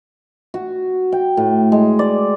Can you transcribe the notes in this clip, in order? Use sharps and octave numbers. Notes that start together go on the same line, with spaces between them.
F#4
G5
A2
G#3
D5